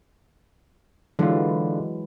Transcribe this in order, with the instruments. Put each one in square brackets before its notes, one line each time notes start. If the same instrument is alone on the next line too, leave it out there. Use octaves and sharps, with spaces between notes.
[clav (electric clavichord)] D3 F4 [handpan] E3 F#3 G#3